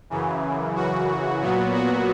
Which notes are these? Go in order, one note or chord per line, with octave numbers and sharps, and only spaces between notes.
F#2 C#3 E3
F#4
A#2 F#3 B3
F#4